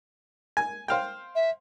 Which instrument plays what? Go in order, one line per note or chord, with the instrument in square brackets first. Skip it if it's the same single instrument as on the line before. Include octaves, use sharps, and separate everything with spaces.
[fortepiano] G#5
C5 F5 G5
[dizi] E5